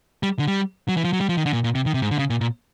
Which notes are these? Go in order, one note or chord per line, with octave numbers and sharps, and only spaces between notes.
G3
D3
G3
F#3
E3
F3
F#3
G3
F3
D#3
D3
A#2
A#2
C3
D#3
C3
G#2
D3
C#3
A#2
A#2